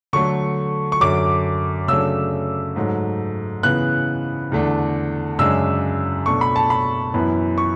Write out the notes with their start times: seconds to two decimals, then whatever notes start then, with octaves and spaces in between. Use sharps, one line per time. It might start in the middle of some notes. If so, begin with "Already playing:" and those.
0.13 D3 F#3 A3 C#6
0.92 C#6
1.00 F#2 D3 F#3 D6
1.88 C#3 F#3 A3 D4 E6
2.76 G#2 F#3 A3
3.63 C#3 E3 B3 F#6
4.52 E2 D3 A3 D4
5.39 F#2 C#3 G#3 D4 E6
6.26 B2 A3 D4 C#6
6.41 B5
6.56 A5
6.70 B5
7.14 F#2 E3 B3 E4
7.58 C#6